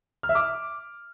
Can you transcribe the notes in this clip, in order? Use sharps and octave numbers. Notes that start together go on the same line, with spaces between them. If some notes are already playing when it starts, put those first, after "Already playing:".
F6
E5
D6